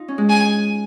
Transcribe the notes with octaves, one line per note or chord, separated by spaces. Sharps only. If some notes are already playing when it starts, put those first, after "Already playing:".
Already playing: D#4 F4
C#4
G#3
G#5